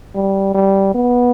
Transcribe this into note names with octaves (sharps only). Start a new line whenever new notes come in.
G3
G3
B3